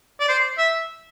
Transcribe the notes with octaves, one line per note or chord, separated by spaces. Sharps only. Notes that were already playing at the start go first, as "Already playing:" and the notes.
D5
C5
E5